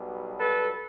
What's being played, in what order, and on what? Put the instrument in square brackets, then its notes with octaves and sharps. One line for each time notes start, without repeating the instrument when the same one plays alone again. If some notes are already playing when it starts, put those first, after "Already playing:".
Already playing: [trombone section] B1 B2 G3
A4 B4